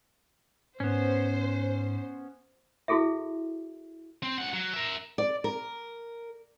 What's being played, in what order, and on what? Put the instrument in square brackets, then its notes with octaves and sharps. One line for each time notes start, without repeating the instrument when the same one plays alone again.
[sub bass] G#2 [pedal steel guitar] B3 C#4 [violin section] C5
[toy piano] E4 F#4 G#4 A4 E5
[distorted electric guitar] C4
C#2 F#5
F#3
A#4 E5
[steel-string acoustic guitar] D5
A#4